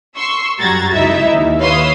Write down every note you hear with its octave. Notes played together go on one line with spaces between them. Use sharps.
C6 C#6 E6
F#2 G3 F#4 A#5 G#6 A6
C#2 D#4 E4 E5 E6
D#2
B4 C#5 F5 C6 D#6 E6